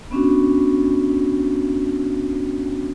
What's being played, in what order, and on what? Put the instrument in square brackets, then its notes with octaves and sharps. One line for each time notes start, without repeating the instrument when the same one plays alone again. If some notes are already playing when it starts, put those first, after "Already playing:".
[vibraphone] B3 C#4 D4 F#4